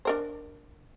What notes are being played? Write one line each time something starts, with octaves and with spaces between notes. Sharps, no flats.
D4 A#4 C5